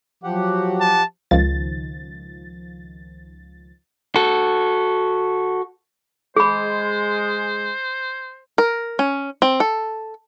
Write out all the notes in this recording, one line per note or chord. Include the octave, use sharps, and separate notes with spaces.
F3 F#3 G4 F#5
A5
C#2 D#3 F3 A6
F#4 A4
G#3 G#4 C5 B5
A#4
C#4
C4
A4